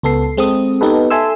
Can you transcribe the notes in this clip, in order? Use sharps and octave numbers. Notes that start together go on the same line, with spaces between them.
C#2 B3 A4 C7
G#3 C4 A4 D#6
B3 D#4 G4 A4 B4
A4 E5 G#5 C6 E6